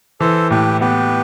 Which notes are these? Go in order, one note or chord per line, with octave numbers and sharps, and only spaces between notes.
E3 A4 C5
A2 G4 B4
B3 G4 B4